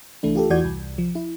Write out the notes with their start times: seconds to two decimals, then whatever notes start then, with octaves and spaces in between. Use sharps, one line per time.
0.23 C2 E3 A3 D4
0.35 F4 G4 A4
0.50 E2 E3 F#4 D5 G6 G#6
0.64 C2
0.98 F3
1.15 E4